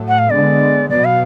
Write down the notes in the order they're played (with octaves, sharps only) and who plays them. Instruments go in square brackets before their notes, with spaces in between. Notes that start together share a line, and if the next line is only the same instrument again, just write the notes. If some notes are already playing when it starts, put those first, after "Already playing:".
Already playing: [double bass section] A2 F#3 A3
[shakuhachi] F#5
F5
[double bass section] D3 G#3 B3 [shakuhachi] D5
[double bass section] B2 F#3 B3 [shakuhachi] D5
[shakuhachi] F5